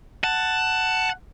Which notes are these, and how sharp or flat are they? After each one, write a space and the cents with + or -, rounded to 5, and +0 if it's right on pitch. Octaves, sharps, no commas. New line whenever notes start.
F#5 +10 A5 +5